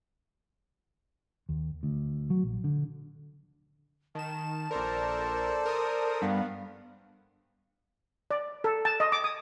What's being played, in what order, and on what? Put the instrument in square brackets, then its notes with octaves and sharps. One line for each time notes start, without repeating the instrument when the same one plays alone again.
[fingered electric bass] D#2
D2
F#3
A#1
D3
[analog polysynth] D#3 E7 [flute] A5
[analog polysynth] A#1 A#4 [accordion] A4 C5 D5
[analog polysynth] A#4 D#6
[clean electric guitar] G2 [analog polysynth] B3 [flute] F5
[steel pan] D5
A4
A5
D#5
D6
D#6